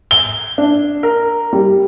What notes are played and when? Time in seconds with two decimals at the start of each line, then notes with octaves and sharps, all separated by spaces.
0.11 G7
0.58 D4
1.03 A#4
1.53 G3